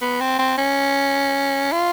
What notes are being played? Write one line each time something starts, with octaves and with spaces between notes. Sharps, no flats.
B3
C4
C4
C#4
F4